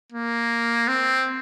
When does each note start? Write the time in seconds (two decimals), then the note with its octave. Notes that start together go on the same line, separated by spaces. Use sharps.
0.12 A#3
0.88 C4